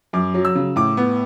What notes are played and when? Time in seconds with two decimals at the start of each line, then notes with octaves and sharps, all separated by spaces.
0.13 F#2 D6
0.34 F#3
0.45 E6
0.55 C#3
0.76 A2 D6
0.97 B3